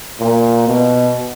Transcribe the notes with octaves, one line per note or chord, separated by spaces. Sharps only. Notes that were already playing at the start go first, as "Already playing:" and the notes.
A#2
B2